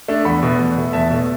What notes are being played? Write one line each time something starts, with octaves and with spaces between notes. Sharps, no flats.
A3 D4
E2 F#5 B5
B2 A3
E2
B2 A3
E2 E5 A5
B2 A3